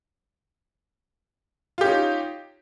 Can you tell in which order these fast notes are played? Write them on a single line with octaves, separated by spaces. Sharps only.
F4 G4 C#4 D#4